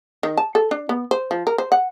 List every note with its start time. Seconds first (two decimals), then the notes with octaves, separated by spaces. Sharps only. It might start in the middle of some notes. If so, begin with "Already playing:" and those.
0.23 D#3
0.37 A5
0.55 A4
0.71 D4
0.89 B3
1.11 C5
1.31 F3
1.47 A#4
1.58 C5
1.72 F#5